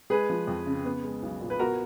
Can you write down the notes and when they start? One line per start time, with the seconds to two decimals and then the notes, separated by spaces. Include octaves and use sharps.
0.10 G#3 G#4 B4
0.30 F3
0.47 F2
0.66 C#3
0.85 B3
1.04 G#3
1.23 B1
1.41 A#2
1.50 B4
1.59 B3 F#4 A#4